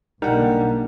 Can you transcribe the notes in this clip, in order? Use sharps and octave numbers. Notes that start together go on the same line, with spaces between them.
B1 D3 G3 A#3 D#4 A#4 F#5